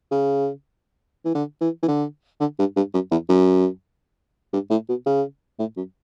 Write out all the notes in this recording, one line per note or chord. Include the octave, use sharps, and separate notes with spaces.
C#3
E3
D3
E3
E3
D3
D3
G2
G2
F#2
E2
F#2
G2
A2
B2
C#3
A2
F#2